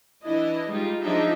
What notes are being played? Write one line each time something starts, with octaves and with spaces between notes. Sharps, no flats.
E3 D4 E4 D#5
G3 G#3 D#4 F4 G4
F3 D4 D#4 G#4 D#5 E5